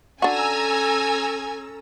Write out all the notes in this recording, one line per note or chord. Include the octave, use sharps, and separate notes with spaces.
C#4 D4 F#4 A4 G#5 A#5 E6